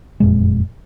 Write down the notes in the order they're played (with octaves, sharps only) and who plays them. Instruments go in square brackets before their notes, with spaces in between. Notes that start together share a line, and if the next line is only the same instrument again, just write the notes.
[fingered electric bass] F#1 F2 A#2 G#3